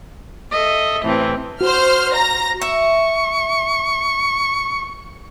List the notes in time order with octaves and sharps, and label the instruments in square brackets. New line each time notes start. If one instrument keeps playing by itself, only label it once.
[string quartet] A4 D#5 E5
A2 C3 E3 C4
[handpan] F#4 [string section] C5 F6
[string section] A#5 A#6
[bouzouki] E5 [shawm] C#6